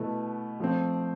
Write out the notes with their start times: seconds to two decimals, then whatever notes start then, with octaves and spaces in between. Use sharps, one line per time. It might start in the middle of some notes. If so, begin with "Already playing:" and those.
Already playing: B2 A3 E4 B4
0.60 F3 A3 C4